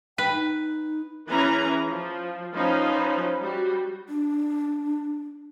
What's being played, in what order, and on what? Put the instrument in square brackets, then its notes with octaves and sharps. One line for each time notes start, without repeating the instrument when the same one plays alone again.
[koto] B4 [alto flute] G5
[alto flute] D#4
[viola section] E3 C#4 E4 G#4 B4 A#5
F3
F3 C#4 D#4 B4 C5
G3 F#4
[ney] D4